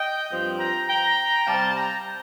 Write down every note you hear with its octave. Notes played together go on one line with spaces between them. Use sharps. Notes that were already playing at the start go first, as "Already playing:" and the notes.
Already playing: D#5 G5
G2 F3 C4
G5 A#5
G5 A#5
C3 G3 C4 F5 A5
G5 A#5